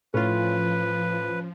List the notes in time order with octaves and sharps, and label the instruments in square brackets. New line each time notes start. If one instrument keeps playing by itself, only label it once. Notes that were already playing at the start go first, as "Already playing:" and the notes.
[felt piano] A2 [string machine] F3 [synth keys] C#4 F4 [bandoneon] B4